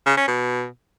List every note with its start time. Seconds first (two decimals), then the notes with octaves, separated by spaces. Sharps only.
0.06 C#3
0.17 C#4
0.28 B2